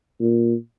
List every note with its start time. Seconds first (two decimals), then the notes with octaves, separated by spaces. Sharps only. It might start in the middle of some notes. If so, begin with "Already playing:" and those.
0.21 A#2